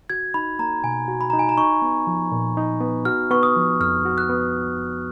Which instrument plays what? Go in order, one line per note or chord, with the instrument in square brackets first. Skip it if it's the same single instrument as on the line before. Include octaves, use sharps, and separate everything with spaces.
[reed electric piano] F#4 [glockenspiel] G#6
[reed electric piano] D#4 [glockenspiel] B5
[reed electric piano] A#3 [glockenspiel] A#5
[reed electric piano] B2 [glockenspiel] G#5
[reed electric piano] F#4
[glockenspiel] B5
[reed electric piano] D#4 [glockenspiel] A#5
[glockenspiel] G#5
A#5
[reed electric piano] D#4 [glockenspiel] C#6
[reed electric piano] B3
F3
A#2
D#4
B3
[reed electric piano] F#4 [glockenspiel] F6
[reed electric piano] B3 [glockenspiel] C#6
[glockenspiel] D#6
[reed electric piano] F3
[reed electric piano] F2 [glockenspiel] F6
[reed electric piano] F#4
[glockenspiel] F#6
[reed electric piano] B3